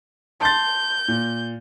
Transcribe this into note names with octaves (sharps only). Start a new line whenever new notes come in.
A5 C6 G6 A6
A#2